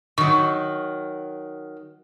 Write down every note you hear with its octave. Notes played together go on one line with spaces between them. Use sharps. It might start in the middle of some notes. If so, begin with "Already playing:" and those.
D#3 F#3 C#6